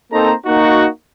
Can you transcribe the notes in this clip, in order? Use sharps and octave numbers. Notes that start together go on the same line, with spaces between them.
A#3 C4 D#4 A4 C5 A#5
A#3 D#4 F#4